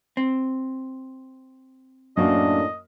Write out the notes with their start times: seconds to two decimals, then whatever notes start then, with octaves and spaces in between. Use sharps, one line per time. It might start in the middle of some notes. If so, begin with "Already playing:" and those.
0.17 C4
2.17 F#2 A2 A#3 D4 F#4 D#5